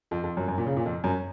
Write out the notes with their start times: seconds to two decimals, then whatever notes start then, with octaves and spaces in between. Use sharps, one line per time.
0.11 F2
0.24 F2
0.37 F#2
0.48 F#2
0.58 A#2
0.67 C#3
0.77 A#2
0.86 F2
1.04 F#2